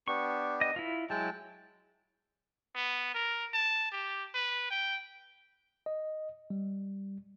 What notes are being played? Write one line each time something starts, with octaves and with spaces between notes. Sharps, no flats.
B3 D4 G4 C#6
D#5
E4 F4
F#3 G#3 E4 G5 A5
B3
A#4
A5
G4
B4
G5
D#5
G3